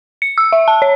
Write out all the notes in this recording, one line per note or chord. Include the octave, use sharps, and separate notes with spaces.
C#7
E6
E5
A5
C#5